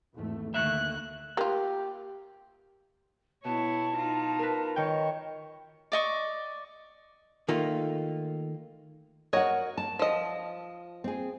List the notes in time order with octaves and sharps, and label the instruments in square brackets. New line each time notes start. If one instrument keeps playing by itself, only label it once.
[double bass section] G#1 E2 A3
[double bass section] D2 D3 D#3 [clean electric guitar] A3 A#3 E5 [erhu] F#6
[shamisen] A#3 F4 [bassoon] G4
[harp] B2 [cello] E4 C#5 [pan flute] A5
[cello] D#4 F4
[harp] A#4 B4
[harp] D#3 G5 [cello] C#5
[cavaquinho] D5 D#5 C#6
[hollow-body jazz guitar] D#3 A3 A#3 F4
[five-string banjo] F#4 C#5 D#5 [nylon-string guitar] A#4 F#5
[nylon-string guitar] A5
[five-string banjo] F3 D#5
[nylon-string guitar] C4 G#4